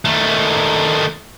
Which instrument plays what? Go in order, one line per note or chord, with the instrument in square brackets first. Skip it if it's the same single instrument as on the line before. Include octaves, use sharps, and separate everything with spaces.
[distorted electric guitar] D#3 A3